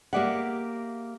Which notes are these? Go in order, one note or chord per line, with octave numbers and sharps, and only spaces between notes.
A#3 G4 G#4 D5 E5 F#5